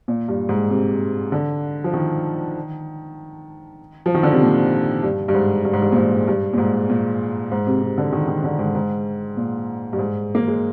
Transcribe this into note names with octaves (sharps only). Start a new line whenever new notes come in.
A#2
G2
G#2
C3
D3
F3
D#3
F3
D#3
D3
C3
A#2
G2
G2
G#2
G2
G#2
G2
A#2
G#2
G2
A#2
G#2
A#2
G#2
C3
C3
D3
D#3
D#3
D3
G#2
G#2
A#2
G2
G#2
A#3
G#3